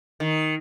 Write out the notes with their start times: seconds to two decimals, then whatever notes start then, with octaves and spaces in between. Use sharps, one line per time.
0.20 D#3